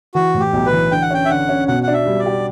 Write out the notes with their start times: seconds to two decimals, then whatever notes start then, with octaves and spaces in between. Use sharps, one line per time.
0.15 E3 F#4
0.34 A2
0.40 G4
0.53 B1
0.66 B4
0.73 E3
0.91 D3 G5
1.02 F#5
1.10 C#4 G5
1.25 E5
1.29 D3 F#5
1.49 C#4
1.68 B2 F#5
1.83 D4 F#5
1.93 E5
2.06 G3
2.19 D5
2.26 G4